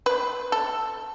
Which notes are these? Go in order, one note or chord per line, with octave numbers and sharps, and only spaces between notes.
B4
A4